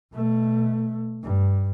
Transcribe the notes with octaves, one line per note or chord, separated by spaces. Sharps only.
B2 A3
G2